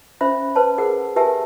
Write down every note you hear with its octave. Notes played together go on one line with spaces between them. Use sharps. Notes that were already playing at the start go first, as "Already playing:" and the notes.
C#4 C5 E5 B5
B4 C5 A5
G#4 A#4 F#5
G4 A#4 B4 E5 G#5 A5